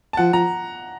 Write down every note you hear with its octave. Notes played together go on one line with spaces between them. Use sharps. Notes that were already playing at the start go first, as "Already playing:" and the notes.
A5
F3 F#5
F3 A#5